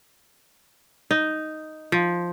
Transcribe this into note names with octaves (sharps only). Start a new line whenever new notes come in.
D#4
F3